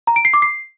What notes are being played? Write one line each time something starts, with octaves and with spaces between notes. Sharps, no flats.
A#5
D7
C7
D6
C7